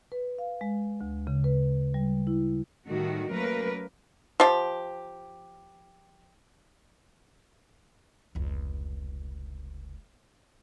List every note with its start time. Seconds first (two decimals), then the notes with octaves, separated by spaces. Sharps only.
0.12 B4
0.38 F5
0.61 G#3
1.01 D2
1.27 C#3
1.44 B4
1.94 G3
2.27 E4
2.89 A2 D#3 G3 A3 F#4
3.32 F#3 A3 A#3 C#4 A#4 B4
4.40 F3 G4
8.35 F1 C#2